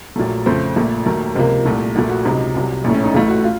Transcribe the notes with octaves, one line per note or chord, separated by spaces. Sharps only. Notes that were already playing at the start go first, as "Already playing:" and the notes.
A#1 A#2 F#3 A3
F2 C#3 A3 C5
A#1 A#2 A3
D#2 D#3 F#3 A3 A#4
C#2 C3 F3 A#3
C2 A#2 A3
A#1 A#2 A3 F#4
F#4
C#2 C3 F#3 D#4
C2 C3 F#3
A#1 A2 A3 C#4
C#4
D#4
A1 A2 A3 F4
F#4
F4